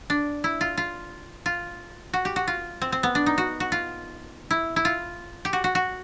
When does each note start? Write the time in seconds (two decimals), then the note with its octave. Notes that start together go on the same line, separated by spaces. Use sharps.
0.10 D4
0.44 E4
0.61 F4
0.77 F4
1.46 F4
2.13 F#4
2.25 G4
2.36 F#4
2.48 F4
2.82 C4
2.92 C4
3.03 B3
3.15 D4
3.26 D#4
3.38 F#4
3.60 F#4
3.72 F4
4.51 E4
4.76 E4
4.85 F4
5.45 G4
5.53 F#4
5.64 F#4
5.75 F#4